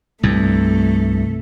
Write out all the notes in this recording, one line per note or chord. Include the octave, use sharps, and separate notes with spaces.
C2 G2 A3